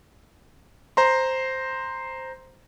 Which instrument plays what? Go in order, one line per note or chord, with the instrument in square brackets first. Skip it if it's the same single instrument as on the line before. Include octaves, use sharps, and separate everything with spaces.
[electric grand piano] C5 A#5 C6